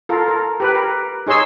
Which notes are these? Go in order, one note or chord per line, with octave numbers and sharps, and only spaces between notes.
F4 A4 A#4
A#4
G4 B4
A#4
D#4 G#4 C#5 C6 E6